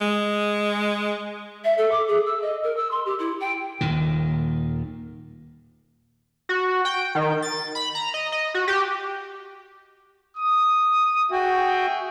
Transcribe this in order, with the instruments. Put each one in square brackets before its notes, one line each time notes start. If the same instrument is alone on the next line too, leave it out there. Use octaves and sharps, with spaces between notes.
[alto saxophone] G#3
[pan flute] E5
A4
D6
G#4
E6
D#5
A#4
E6
C6
G4
E4
G5
[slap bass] D#1 D#2 A#2 D#3
[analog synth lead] F#4
G5
D#3
A6
B5
A#5
D#5
D#5
F#4
G4
[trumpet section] D#6
[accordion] F#4 [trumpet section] G#4 E5 G5